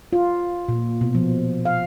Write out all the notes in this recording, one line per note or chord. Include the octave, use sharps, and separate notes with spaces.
F4
A#2
B2
F3
F5